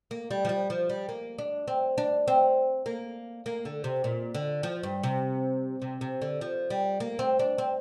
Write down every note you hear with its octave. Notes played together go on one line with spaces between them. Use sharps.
A#3
G3
F3
G3
F3
G3
A#3
D4
C4
D4
C4
A#3
A#3
D3
C3
A#2
D3
F3
G2
C3
C3
C3
D3
F3
G3
A#3
C4
D4
C4